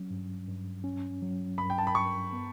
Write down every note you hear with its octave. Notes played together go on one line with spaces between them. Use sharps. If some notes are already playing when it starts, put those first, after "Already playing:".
Already playing: F#3 C#4
G2
G2
C#4
F#3
G2 B5
G5
A5
B5
G2 C#6
B3